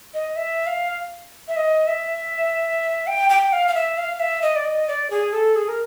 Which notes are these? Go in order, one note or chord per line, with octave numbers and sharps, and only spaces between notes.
D#5
E5
F5
E5
D#5
E5
G5
G5
F5
F5
E5
F5
E5
D#5
D5
D#5
D5
G#4
A4
G#4
A#4